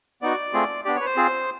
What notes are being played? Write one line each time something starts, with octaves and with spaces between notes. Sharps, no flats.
B3 D#4 F#4 D5
A3 C4 F4 G#4
B3 D4 G4 D5
C#5
B4
C5
C4 F4 G#4